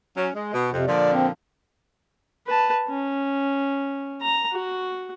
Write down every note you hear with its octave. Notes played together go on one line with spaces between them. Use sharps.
F#3 C#4
G#3
B2
F2 C3
A#2 D3 F3 D5
C4
B4 A5
C#4
A#5
F#4